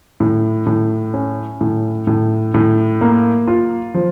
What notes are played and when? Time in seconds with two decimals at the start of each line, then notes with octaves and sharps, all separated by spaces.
0.20 A2
0.66 A2
1.14 C#4
1.61 A2
2.07 A2
2.54 A2
3.01 A#3
3.48 F4
3.94 F3